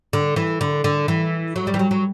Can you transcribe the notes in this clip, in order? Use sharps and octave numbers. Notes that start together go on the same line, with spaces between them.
D3
E3
D3
D3
E3
F#3
G3
E3
F#3
F#3